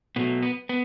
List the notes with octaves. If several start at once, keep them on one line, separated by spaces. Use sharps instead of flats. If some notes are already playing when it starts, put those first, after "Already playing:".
B2 F#3 A3 B3
B3
B3